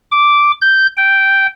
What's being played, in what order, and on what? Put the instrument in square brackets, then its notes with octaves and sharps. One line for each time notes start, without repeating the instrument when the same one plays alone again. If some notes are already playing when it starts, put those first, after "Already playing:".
[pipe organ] D6
G6
G5